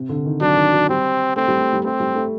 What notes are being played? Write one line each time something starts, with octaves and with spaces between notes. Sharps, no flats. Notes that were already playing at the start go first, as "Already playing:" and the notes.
Already playing: C3
D3
D#3
F#3 D4
D#3
F#3
G3 C4
A3 C4
G3
A3
G3
A3 C4
G3
A3